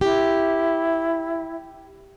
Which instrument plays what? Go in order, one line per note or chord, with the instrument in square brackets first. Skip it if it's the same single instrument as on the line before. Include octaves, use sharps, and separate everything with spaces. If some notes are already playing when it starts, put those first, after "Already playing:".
[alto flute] E4 [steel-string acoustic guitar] G4